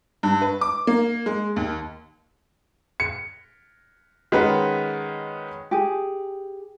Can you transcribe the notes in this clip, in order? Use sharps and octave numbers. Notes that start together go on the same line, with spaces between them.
G2
B4
D6
A#3
G#3
D#2
C#7
D#3 G#3 C#4 F#4 B4
G4 G#4